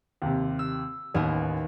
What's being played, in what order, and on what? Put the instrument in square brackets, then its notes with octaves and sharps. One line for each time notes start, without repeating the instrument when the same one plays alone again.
[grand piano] D#2 C3
[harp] E6
[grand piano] A1 [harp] D#2 B3